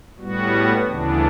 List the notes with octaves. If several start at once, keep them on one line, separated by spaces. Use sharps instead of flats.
A2 G3 B3 F#4
D2 C#3 E3 B3 D4